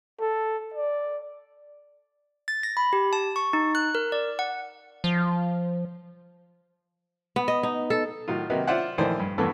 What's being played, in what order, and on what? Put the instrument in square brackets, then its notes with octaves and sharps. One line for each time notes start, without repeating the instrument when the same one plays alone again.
[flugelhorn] A4
D5
[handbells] A6
A#6
B5
G4
A5
C#6
D#4
F#6
A#4
D5
F#5
[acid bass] F3
[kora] B3
D#5
D#4
A4
[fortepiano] A2 D#3 F#3 F4
C3 D#3 F#3 A#3 D#4 B4
F4 C5 D5 E5 F#5
A#1 D#3 E3 A3 C5 D5
G2
A1 E2 G2 A3 B3 A4